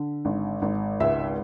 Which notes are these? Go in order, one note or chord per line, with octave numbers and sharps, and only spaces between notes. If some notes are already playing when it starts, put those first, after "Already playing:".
Already playing: D3
G#1
G#1
C#2 E5